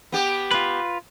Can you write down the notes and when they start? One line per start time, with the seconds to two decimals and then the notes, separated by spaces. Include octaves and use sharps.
0.12 B3 G4
0.51 F4 B4